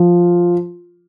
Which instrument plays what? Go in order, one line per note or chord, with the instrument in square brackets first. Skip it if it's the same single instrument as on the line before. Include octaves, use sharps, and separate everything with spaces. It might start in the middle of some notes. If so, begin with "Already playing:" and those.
Already playing: [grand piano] F3 F4